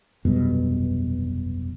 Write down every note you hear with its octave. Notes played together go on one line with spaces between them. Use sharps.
F1 B1 G2 B2